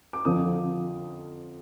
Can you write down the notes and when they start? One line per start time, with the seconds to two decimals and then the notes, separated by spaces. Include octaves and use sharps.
0.13 D6
0.25 F2 D3 F3 D#6